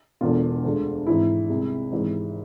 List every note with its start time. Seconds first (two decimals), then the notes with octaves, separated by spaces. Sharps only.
0.21 E1 E2 D3 F4
0.64 D2 D3 G#3
1.06 G#1 G#2 E3 G#3 E4
1.49 C2 C3 G#3
1.92 G#1 G#2 E3 G#3